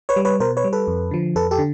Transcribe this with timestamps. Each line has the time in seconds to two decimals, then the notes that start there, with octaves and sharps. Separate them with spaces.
0.09 B4 C#5
0.16 G3
0.25 B4 C#5
0.40 B2 A#4 C5
0.57 B4 C#5
0.64 G3
0.73 A4 B4
0.87 F2
1.11 D3 F3
1.35 F2 A4 B4
1.51 G4 A4
1.59 D3